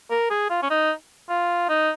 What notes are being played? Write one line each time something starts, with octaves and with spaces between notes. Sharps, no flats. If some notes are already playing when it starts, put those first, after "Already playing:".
A#4
G#4
F4
C#4
D#4
F4
D#4